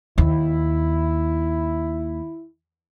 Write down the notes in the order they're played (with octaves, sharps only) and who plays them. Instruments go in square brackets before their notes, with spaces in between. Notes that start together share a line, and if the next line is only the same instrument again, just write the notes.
[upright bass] D#2 [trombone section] E4